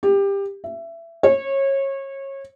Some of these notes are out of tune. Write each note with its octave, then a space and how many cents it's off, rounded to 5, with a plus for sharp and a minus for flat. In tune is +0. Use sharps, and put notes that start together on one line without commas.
G4 +20
E5 +20
C#5 -25